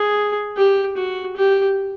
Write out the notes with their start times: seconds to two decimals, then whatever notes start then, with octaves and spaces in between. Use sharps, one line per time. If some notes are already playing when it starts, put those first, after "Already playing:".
Already playing: G#4
0.57 G4
0.97 F#4
1.36 G4